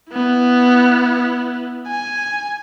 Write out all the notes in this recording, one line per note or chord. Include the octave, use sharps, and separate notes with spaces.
B3 E4
G#5